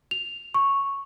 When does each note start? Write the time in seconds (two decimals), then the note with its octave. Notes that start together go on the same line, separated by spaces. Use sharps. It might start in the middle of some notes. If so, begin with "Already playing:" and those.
0.11 F7
0.54 C#6